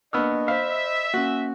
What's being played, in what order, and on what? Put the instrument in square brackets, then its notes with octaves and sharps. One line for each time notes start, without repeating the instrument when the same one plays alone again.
[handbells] A#3 D4 C#6 [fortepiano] B3 E6 F6 [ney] D#5
[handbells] C5 B5 [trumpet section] E5 [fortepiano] F5
[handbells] A#3 C#4 [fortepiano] F#4